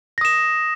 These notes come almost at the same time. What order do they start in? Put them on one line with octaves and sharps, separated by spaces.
A#6 D#6 E7